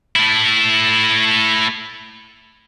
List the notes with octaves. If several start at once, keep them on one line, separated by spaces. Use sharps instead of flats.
A3 E4